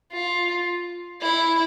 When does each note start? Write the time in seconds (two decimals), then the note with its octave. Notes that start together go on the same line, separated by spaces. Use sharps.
0.13 F4
1.22 E4